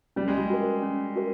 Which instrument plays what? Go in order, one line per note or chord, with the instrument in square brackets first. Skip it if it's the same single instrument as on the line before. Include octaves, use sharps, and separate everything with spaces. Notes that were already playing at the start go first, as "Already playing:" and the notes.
[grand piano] G3 [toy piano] C#4
[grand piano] G#3
G3
[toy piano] F#4 A#4
C#4
F#4 A#4